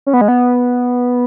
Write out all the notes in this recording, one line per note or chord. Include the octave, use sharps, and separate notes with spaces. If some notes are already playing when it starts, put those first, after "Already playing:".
C#4
B3
G#3
B3